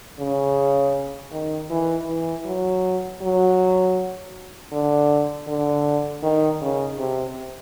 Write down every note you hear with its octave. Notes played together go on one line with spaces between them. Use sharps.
C#3
D#3
E3
E3
F#3
F#3
D3
D3
D#3
C#3
C3